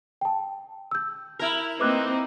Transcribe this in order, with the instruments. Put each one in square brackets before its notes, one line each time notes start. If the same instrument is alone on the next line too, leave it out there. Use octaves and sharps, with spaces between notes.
[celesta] G5 A5
E6 G6
[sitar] E4 A#4
[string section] A#3 C4 D#4 [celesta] B4 D6 F#6